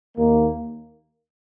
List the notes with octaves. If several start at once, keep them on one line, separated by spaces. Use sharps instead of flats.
D#2 D#3 A#3